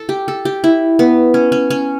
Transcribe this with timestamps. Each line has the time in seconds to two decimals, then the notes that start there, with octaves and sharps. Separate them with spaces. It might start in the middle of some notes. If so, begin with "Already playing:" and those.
Already playing: A4
0.09 G4
0.28 A4
0.45 G4
0.64 E4
0.99 B3
1.34 C#4
1.52 C#4
1.70 C#4